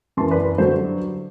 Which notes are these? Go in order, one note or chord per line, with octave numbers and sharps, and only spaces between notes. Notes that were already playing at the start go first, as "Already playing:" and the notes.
F#2 E3 A5 C6
B4 D5
B4
G2 D3 F#3 A4 C5